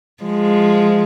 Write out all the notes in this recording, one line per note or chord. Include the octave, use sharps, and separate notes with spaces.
F3 G#3